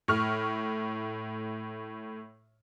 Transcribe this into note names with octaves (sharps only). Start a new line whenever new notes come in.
A2 C#6 F6